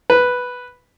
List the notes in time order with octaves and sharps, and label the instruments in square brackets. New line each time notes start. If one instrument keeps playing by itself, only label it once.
[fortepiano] B4